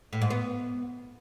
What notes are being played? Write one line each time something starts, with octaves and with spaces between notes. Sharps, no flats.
A2
G#2
B3